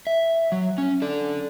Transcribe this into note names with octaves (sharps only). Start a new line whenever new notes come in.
E5
F#3
C#4
A4 D5